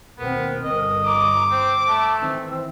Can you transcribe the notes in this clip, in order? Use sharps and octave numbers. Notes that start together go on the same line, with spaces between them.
D#2 B2 B3 C4 A#4
G1 D#5
A#5 D6
C4 C5
A3 A5
D#3 E3 C4 E6